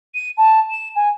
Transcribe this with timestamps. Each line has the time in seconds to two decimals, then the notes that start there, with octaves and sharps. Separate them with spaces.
0.14 D#7
0.37 A5
0.70 E7
0.95 G#5